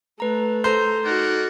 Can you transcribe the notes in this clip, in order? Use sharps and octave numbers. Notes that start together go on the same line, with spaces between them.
A3 B4 A#5
A4 C5 A#5 G6
D#4 F#4 A#4 D5 F#5